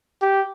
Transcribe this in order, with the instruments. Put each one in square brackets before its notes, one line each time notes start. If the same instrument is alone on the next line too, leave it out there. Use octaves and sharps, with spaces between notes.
[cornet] G4